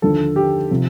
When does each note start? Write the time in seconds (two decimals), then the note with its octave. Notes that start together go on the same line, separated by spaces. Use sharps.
0.02 D#2 D3 F3 A4
0.36 G4
0.71 C3 F3